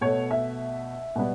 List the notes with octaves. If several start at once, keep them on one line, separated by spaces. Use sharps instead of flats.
B2 A3 C#5
E5
B2 G3 B3